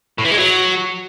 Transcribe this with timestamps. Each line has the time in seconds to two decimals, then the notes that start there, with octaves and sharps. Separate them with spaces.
0.18 A2
0.25 E3
0.31 G#3
0.37 F#3